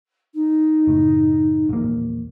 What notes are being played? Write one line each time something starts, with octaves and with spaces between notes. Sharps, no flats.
D#4
F#1 A2
A#1 E2 A#3